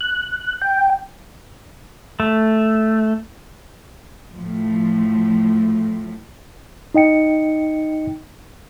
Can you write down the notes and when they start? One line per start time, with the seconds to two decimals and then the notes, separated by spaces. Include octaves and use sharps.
0.01 F#6
0.62 G5
2.20 A3
4.35 A2 F3
6.95 D#4 D#5 G5 C#7